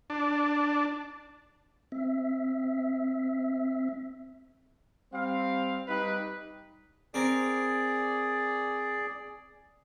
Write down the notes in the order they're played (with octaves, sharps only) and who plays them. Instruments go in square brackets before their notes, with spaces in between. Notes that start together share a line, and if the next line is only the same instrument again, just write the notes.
[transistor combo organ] D4
[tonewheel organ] C4 E5
[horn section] G3 C4 F5
G3 D#4 B4
[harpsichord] C4 A#4 [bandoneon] G#4 D5